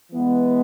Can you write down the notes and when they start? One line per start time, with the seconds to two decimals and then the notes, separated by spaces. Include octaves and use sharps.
0.12 E3 G#3 B3